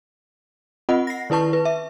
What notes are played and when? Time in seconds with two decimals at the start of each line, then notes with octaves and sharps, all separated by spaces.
0.89 C4 F4 D#5 F#5
1.07 A#6 C7
1.30 D#3 E4 B4 A5 C#6
1.53 B4
1.65 E5